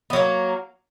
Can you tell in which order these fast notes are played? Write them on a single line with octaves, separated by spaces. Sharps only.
B3 F#3 A#3